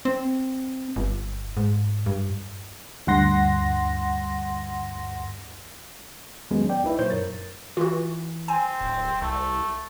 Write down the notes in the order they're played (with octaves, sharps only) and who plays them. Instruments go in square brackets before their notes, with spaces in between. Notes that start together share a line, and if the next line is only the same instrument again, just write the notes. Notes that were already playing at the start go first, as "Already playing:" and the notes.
[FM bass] C4
G1
G#2
G2
[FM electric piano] D2 G2 F#5 C6 A#6
[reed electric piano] E2 D#3 F#3 G#3 B3 C#4
D5 G5
C2 D#4 E4 B4 E5
A#2 F#3 C5 C#5 C6 G6
F#2 A#4 A6
[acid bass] E3 [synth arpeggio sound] F4 F#4
[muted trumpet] C4 [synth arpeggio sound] G#5
[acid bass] D1
[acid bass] C2 [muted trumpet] A3